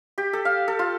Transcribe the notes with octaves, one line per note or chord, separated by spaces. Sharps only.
G4
A4
F5
A4
F4